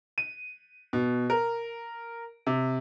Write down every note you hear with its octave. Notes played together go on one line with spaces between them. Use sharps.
D#7
B2
A#4
C3